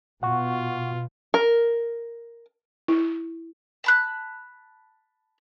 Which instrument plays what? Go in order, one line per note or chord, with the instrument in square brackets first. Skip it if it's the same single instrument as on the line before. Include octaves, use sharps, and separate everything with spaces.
[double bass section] B2 [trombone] F4 [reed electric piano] F#5 C#6
[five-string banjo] A#4
[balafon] E4
[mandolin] A5 B5 F#6